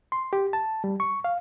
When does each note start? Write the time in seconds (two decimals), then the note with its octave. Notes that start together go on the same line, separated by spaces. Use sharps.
0.12 C6
0.33 G4
0.53 A5
0.84 G3
1.00 C#6
1.24 F5